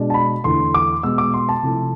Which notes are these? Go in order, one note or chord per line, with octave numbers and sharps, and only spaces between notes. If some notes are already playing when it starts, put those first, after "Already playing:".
Already playing: B2 G#3 D4
A5
B5
E2 D3 A3 E4 C6
D6
B2 G#3 B3 E6
D6
C6
A5
C3 F3 A3 E4